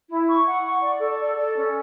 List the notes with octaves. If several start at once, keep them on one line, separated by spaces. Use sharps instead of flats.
E4
C#6
F#5
C#6
D5
A4
D5
A4
C#4